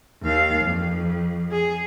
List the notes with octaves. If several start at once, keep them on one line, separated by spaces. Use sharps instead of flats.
D#2 F5
F2
G#4